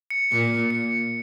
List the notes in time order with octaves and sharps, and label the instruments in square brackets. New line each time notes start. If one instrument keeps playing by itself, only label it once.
[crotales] C#7
[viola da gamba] A#2
[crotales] C#7